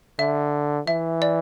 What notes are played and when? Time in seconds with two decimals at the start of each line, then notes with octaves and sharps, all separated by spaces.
0.19 D3 E5
0.87 E3 E5
1.22 D5